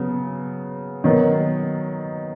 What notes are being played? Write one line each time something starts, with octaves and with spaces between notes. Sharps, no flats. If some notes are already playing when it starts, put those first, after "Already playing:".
Already playing: C#3 F#3 B3
D#3 F#3 B3 D#4